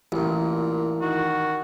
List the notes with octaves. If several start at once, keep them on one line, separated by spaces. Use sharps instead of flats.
A1 A#2 E4 A#4
D#3 F#4